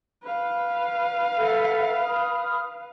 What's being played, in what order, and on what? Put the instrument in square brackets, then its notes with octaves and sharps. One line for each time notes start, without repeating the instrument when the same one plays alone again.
[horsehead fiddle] B4 F5
[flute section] A4 E5 F#5
B5 D#6 F6